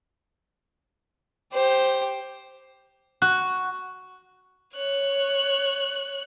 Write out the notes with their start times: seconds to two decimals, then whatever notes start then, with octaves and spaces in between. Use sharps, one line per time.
1.53 G4 C5
3.22 F#4 F#6
4.74 C#5 F#6